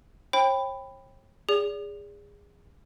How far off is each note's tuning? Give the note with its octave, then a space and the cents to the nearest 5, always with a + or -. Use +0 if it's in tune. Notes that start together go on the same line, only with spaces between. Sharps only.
C#5 -45 G5 +15 B5 +10
G#4 -25 D5 -30